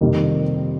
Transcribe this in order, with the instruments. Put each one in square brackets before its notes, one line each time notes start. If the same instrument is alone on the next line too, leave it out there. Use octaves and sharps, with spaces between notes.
[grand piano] F2 C3 D#3 G3 A#3